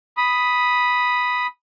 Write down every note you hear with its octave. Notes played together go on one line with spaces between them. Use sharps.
B5 D#6